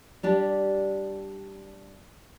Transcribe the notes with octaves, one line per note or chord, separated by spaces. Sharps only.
G3 D4 G4